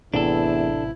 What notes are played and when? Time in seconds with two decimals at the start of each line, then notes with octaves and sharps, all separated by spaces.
0.14 A1 E2 A2 C3 D4 E4 A4